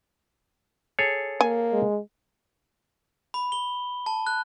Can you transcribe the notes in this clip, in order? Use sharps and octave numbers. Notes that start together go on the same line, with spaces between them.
G#4 A4 C#5
A#3 G#5
G#3
B5
G7
A5
F#6